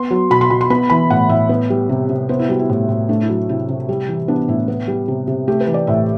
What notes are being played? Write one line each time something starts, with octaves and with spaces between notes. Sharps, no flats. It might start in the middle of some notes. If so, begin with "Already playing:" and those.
Already playing: B3 C6
F#3
B2 B5
C6
B2 B5
C6
B3 B5
E3 B5
A2 F#5
A2 E5
B3
G3
C3
C3
B3 C5
E4
G3 F#4
E4
A2
A2
A3 D4
E4
F#3
C3 E4
C3
G3
E3
B3 D4
A2 E4
B3
G3
C3
C3
A3 G4
B4
E3
D5
A2 E5